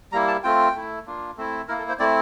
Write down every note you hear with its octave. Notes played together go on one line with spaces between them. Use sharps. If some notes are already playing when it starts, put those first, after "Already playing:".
G3 A#3 E4 A#5
A5
A3 C4 F4 G5
A3 E4
A#3 D4 F4
A3 C4 E4
A#3 E4 A#4
A4
C5
A3 C4 E4 D5